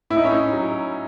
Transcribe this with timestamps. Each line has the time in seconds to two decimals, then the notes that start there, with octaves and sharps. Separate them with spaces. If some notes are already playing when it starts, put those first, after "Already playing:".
0.10 A2 E4
0.17 D#4
0.24 C#4
0.31 A2 D#4
0.53 F#3